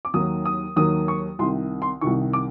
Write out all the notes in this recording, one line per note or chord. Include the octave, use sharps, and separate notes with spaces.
D6
D#2 D#3 F#3 A#3 D#6
D#6
D#2 D#3 F#3 A#3 D#6
C#6
C2 C3 D#3 C6
C6
C2 C3 D#3 C#6
D6